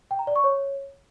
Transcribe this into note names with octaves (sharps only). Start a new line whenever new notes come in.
G5
A#5
D5
C#6
C#5